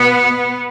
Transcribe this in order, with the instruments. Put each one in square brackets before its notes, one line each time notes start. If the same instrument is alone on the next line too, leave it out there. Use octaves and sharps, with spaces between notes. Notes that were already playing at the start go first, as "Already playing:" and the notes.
Already playing: [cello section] B2 B3